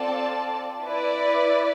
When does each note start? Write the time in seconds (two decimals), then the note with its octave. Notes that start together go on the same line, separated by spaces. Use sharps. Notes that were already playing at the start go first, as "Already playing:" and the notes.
Already playing: C4 F4 A4 D5 A5
0.83 E4 B4 D5